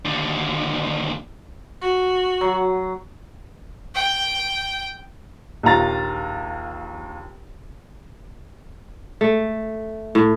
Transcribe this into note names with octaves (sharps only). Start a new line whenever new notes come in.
D#2 D3
F#4
F#3
G5
A#1 D#2 F4 A#5 A6
A3
A2